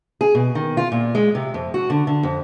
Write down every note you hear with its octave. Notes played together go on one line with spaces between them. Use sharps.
G#4
B2
D#3
F4
A#2
G#3
C3
F2
F#4
D3
D3
F2